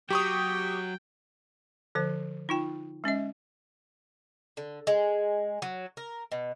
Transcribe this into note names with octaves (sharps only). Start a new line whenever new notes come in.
F#3 G4 G5 C#6 D#6
D3 F3 C5
D#4 F4 G5
G#3 C#4 D#5 E5
D3
G#3
F#3
A#4
B2